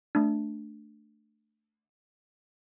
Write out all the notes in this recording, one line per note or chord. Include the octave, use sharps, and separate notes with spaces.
A3 D4